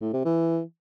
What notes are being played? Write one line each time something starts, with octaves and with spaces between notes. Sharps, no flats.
A2
C3
E3